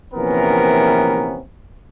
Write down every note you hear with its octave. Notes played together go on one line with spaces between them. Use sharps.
A#1 C3 E3 B3 C#4 A#4